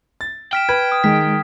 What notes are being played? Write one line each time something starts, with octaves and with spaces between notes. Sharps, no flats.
A6
G5 F6 B6 E7
B4 G#6
D#6
D#3 G#3 B6